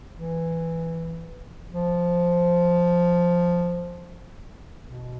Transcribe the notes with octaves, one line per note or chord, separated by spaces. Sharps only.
E3
F3
B2